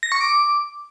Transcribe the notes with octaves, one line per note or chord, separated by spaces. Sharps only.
A#6
C#6
D6